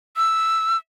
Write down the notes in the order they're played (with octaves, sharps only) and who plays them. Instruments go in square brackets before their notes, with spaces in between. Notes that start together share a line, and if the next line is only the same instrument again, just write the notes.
[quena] E6